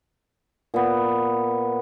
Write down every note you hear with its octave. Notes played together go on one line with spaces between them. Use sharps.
A#2 B3